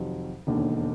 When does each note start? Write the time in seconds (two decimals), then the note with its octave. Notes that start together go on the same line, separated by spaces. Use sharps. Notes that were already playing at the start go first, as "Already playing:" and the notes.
Already playing: F2 C3 D#3 F#3
0.47 E1 D#2 D3